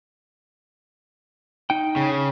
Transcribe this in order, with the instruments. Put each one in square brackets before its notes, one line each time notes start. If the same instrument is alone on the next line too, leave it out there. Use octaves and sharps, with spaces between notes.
[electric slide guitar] D#4 G5
[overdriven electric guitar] C#3